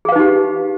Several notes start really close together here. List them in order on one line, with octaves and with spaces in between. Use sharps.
G#4 F5 B4 D#4 G4